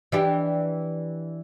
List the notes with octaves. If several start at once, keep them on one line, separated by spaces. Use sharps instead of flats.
E3 D4 G4